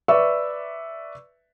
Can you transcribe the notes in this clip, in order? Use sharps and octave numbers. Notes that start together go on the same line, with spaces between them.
B4 D5 E5 C#6 E6